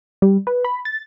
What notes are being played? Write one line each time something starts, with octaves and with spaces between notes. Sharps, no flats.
G3
B4
B5
A6